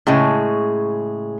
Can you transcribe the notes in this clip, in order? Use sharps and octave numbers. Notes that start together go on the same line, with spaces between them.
A2 C#3 G#3